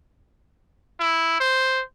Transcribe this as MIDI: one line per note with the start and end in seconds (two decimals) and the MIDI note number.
1.00 1.39 64
1.40 1.82 72